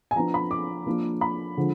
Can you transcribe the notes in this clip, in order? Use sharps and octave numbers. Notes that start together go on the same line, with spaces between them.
G#5
F3 B3 D4 A#5
B5
D6
F3 A#3 D4
B5
D3 F3 G#3